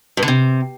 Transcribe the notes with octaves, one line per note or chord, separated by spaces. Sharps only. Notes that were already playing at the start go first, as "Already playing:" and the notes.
G2
D3
C3